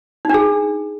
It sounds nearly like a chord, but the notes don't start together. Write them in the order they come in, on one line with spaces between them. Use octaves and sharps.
D#4 D4 G#4